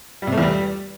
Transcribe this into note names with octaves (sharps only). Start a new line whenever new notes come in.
G3
C3
A3
E2
G3